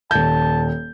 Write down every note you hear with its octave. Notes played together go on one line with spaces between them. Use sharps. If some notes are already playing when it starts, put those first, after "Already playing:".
D#1 A5 G6